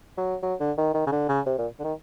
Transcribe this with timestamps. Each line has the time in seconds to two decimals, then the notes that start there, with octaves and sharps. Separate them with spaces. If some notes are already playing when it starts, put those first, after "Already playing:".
0.18 F#3
0.42 F#3
0.60 D3
0.78 D#3
0.94 D#3
1.07 C#3
1.12 D3
1.28 C#3
1.46 C3
1.58 A#2
1.79 D3
1.84 D#3